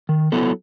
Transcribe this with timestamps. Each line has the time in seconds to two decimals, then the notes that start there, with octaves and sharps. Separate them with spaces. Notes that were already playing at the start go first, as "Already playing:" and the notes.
0.09 D#3
0.32 F#3 B3 E4 A4